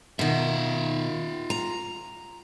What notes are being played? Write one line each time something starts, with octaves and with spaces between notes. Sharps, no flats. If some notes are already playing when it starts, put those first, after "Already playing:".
B2 D#3 F4 E5
A#5